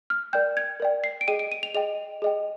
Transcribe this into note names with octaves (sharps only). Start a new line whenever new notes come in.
F6
A#4 D5 G5 G6
G#6
A#4 D5 G5
C7
D7
G#4 D#5 G5 D#7
D7
D#7
F7
G#4 D#5 G5 F7
G#4 D#5 G5